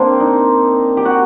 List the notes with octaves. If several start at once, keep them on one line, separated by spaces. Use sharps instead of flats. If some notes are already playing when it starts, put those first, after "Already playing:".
Already playing: A#3 C4 D4
D#4
G4
F#4